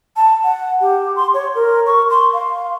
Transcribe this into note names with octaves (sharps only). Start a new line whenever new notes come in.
A5
F#5
G4
C6
C#5
A#4
C#6
C6
F5